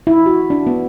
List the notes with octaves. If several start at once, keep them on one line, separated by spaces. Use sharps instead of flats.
E4
F#4
D4
B3